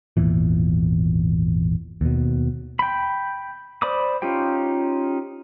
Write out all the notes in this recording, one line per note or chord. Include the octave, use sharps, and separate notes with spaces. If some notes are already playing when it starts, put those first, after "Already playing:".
G#1 E2 A#2 E3
D#2 B2
G5 B5
C5 D5 B5 D6 D#6
C#4 D#4 F4 G4 G5